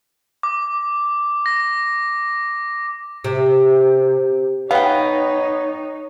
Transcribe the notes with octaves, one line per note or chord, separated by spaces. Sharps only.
D6
A#6
C3
B3 D#4 C#5 F5 G5